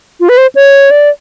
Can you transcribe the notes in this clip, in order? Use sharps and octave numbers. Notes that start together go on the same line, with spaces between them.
F4
B4
C5
C#5
D5